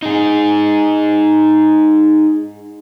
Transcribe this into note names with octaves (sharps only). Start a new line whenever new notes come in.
D#4 G#4